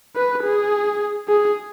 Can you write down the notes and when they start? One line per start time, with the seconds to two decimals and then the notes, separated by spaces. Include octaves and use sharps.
0.16 B4
0.43 G#4
1.28 G#4